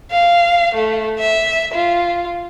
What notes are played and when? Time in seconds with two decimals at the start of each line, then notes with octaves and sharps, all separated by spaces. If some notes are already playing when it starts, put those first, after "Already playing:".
0.11 F5
0.75 A3
1.20 E5
1.74 F4